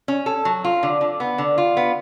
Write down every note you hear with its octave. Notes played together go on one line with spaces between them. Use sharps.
C#4
A4
F#3
F4
D3
D3
B3
D3
F4
B3